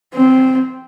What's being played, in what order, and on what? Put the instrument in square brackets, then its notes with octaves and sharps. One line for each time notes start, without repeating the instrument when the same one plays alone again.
[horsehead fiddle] C4